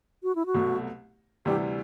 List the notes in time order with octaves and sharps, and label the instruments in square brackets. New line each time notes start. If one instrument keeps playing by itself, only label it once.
[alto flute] F#4
E4
F#4
[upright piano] C2 B2 F#3 A3
[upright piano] D2 C3 E3 G3 [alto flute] G4